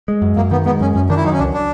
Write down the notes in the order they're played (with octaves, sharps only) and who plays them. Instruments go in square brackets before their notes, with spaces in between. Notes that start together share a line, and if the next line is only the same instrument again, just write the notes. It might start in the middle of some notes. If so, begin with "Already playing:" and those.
[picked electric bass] G#3
F#2
[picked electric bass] F#2 [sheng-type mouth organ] A#3
[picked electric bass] D#3 [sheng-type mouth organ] B3
[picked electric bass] G#3 [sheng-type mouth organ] B3
[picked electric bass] F#2 [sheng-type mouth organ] C#4
[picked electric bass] F#2 [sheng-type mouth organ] C#4
[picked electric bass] D#3 [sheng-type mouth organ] D4
[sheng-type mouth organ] E4
[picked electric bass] F#3 [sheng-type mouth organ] D#4
[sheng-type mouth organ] C#4
[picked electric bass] C#2 [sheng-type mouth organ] D4
[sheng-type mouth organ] D4